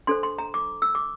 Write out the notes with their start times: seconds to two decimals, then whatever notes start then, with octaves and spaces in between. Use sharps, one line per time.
0.07 D4 A4 C5 C6
0.23 C6
0.39 A#5
0.54 D6
0.82 E6
0.95 D6